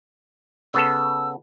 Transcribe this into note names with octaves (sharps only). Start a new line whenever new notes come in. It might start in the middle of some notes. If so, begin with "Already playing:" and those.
C#3 B3 A4 E6